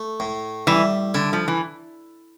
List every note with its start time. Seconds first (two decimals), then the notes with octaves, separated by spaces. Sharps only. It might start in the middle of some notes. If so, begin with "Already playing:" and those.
Already playing: A3
0.20 A2
0.67 E3 G3
1.14 D3 E4
1.33 F3
1.48 E3